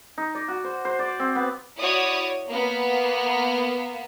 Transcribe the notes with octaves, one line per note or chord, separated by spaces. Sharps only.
D#4
D5
F#4
C5
C5
D5
C4
B3
E4 F#4 C#5 D5 D#6
A#3 B3